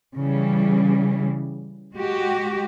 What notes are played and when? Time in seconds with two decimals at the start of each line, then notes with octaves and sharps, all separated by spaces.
0.15 C#3 E3 G3
1.94 G#3 F#4 G4